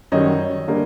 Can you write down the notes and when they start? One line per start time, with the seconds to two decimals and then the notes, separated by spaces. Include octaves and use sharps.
0.12 F#2 D#3 G3 C#5 D#5
0.68 D3 G3 A#3